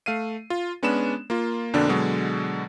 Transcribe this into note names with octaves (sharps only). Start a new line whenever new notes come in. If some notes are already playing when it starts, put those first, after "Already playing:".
A3 F5 C7 D#7
F4
G#3 B3 C#4 D4 B5 E7
A#3 F4
F2 B2 D3 A#3 D4
B2 D3 F#3 G#3